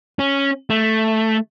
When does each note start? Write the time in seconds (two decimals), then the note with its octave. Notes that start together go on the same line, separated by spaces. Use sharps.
0.19 C#4
0.70 A3